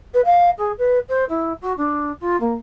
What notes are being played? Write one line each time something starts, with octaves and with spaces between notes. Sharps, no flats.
B4
F5
G#4
B4
C5
E4
F#4
D4
F4
A#3